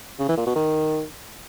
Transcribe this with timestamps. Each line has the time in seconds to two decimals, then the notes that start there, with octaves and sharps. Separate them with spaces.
0.19 C#3
0.28 E3
0.37 A#2
0.46 B2
0.55 D#3